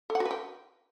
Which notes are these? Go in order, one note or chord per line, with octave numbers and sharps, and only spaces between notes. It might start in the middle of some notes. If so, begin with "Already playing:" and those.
A4
F#5
F#4
B4
G5